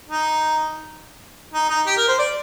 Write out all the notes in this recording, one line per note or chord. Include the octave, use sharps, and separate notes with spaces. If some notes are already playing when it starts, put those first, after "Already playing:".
D#4
D#4
D#4
G4
A#4
C5
D5